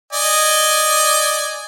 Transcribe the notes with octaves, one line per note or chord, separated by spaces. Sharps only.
D5 D#5 G#5